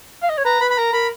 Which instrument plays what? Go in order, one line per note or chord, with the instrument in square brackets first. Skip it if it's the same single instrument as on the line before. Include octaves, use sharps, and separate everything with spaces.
[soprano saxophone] F5
D#5
C#5
[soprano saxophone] B4 [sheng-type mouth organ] A#5
[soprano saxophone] B4 [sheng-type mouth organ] B5
[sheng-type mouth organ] B5
[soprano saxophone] A#4 [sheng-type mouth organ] A#5
[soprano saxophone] A#4 [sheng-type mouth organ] B5